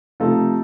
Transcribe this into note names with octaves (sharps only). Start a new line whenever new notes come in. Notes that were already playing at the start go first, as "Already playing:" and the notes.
C3 F3 A3 D#4 F4 A4